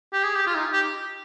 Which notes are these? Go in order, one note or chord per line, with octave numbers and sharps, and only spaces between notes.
G4
G#4
G4
F4
D#4
G4